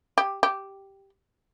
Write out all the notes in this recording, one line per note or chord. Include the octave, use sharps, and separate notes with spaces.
G4
G4